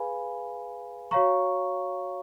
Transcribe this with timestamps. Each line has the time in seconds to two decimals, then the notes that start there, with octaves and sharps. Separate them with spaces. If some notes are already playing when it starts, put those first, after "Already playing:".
Already playing: G#4 B4 F5 G#5 B5
1.11 F#4 C#5 F5 A#5 C#6